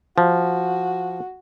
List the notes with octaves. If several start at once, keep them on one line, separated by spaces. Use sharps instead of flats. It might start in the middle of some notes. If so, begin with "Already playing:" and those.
F3 F#4